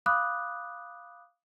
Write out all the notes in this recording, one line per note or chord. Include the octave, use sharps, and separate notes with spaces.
F5 B5 D6 D#6 F#6